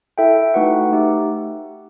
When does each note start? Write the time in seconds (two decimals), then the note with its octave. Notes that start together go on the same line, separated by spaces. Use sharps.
0.18 E4 A4 E5 G5
0.54 A3 D#4 F#4 B4 F#5
0.92 A3 D#4 G4